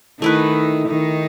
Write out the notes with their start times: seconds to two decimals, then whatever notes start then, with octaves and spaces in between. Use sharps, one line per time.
0.21 D#3 A3 D#4 E4 B4
0.88 D#3 D#4